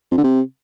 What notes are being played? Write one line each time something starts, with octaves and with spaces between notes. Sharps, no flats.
F2
D3
C3